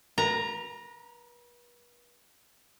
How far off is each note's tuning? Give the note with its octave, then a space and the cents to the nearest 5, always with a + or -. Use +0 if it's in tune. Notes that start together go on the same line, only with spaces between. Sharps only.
B4 -40 A#5 +0